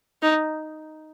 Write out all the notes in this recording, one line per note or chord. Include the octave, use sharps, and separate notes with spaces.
D#4